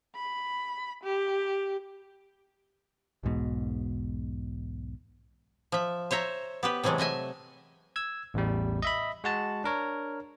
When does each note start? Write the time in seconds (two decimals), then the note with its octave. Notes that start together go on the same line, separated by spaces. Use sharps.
0.15 B5
1.04 G4
3.23 B1 E2 G#2 B2
5.72 F3 E5
6.11 C5 C#5 E5 A#5
6.63 B3 G4 B4
6.83 C3 E3 F#3 G#3 A3
6.98 A3 D#5 E5 G#5
7.96 E6 G#6
8.34 A1 E2 G3
8.82 D#5 E5 B5
9.24 G#3 F#4 A5
9.64 D4 A#4 C#5